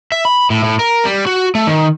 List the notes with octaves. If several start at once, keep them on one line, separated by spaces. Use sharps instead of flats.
E5
B5
A2
A2
A#4
G3
F#4
A3
D#3